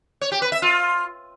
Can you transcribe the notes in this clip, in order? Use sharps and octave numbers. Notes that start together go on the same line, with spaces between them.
C#5
G4
B4
E5
F4